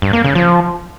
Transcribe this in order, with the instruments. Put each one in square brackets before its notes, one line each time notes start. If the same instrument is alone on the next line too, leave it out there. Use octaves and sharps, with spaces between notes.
[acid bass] G2
A#3
C#3
F3